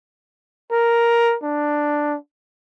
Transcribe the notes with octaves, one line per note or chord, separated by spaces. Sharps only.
A#4
D4